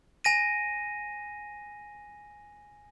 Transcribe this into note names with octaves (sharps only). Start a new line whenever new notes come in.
G#5 A#6 D#7